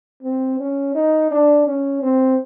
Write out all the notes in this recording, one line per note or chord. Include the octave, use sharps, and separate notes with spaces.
C4
C#4
D#4
D4
C#4
C4